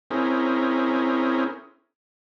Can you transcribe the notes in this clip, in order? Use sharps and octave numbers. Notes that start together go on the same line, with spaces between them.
C4 C#4 E4 G#4 A#4